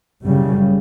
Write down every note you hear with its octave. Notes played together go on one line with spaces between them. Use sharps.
F#1 F#2 C#3 G3